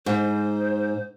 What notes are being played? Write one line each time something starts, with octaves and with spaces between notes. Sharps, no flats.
G#2 C5